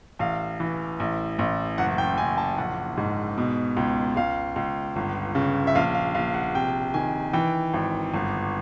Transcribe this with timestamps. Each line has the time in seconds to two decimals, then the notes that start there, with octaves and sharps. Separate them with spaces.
0.19 A1 F5
0.60 E3
1.00 A1
1.39 A1
1.78 F#1 F#5
1.98 G5
2.18 F#1 G#5
2.38 A5
2.58 A#1 F#5
2.97 G#2
3.38 B2
3.77 C#2
4.16 C#2 F5
4.56 C#2
4.96 G1
5.35 C#3
5.67 E5
5.75 A#1 F5
5.95 F5
6.15 A#1 F5
6.34 F#5
6.54 C3 G5
6.94 D#3 G#5
7.33 E3 G5
7.74 G#1
8.14 G1